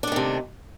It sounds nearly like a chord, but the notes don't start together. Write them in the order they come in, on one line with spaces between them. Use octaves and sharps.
D4 A3 D#3 C3